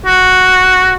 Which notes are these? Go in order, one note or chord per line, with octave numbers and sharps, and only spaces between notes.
F#4